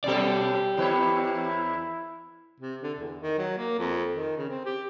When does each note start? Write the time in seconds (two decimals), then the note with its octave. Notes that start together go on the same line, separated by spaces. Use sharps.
0.04 F#2 B2 G4 A4 D5
0.77 E2 E4 B4 C#5
2.60 C3
2.83 D3
2.98 E2
3.21 D#3
3.38 F#3
3.58 A#3
3.79 F2
4.13 D#3
4.38 C#3
4.49 C4
4.65 G4